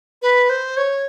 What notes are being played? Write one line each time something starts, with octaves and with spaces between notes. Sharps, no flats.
B4
C5
C#5